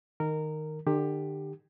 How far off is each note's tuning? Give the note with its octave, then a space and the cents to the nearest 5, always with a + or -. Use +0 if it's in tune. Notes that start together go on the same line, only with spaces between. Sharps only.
D#3 -5 A#4 -15
D3 +40 G4 +15